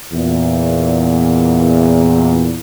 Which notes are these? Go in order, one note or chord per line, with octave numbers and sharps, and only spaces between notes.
E2 A#2